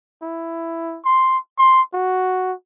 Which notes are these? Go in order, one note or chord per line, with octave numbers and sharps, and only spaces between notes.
E4
C6
C6
F#4